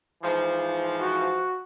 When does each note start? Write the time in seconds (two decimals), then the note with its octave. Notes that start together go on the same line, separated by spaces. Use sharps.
0.23 G#2 E3 F3
1.02 F#4